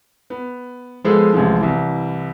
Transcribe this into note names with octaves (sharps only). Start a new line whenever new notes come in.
B3
F3 G#3 B3 G#4 A4 C5
A1 C3 F3 G#3
C2 E3